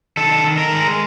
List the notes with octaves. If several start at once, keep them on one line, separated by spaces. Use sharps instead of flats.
D#3 A4
D#3
A#4
G#3